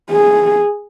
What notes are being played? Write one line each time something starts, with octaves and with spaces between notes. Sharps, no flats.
G#4